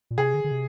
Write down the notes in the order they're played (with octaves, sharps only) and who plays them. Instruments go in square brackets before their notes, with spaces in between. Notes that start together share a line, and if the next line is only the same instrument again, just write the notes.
[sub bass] A#2
[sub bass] C3 [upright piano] G#4
[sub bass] D3
D3
C3